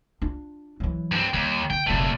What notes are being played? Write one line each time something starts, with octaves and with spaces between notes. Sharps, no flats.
D4 F4
E3 F#3
G2 C4
D#2 G3
D3 G5
F1 F#2 A#2 A3